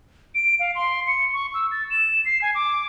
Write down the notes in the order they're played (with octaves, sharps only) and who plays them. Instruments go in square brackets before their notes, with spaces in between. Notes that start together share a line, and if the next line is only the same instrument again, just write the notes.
[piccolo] D7
F5
C6
C#7
C#6
E6
A6
E7
C7
G#5
D6